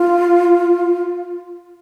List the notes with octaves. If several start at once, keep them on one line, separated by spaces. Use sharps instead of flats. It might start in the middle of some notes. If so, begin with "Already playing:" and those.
Already playing: F4